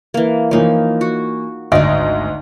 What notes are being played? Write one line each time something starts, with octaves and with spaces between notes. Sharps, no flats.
E3 A#3
E3 F3 A#3 D#4 C#5
F#4
G#1 D2 D#4 D5 D#5